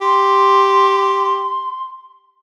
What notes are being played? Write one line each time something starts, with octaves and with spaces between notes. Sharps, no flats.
G4 C6